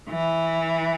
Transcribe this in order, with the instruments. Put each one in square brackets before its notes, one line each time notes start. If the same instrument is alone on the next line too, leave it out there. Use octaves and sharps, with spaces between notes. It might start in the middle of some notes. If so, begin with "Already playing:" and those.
[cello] E3